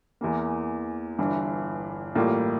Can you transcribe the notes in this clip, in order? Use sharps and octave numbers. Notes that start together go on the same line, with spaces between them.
E2 E3 A#3
G1 G2 E3
A1 A2 G3 A#3 F4